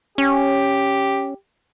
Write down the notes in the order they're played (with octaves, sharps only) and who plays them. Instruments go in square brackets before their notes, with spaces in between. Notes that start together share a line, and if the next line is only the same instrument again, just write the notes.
[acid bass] C#4 [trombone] G4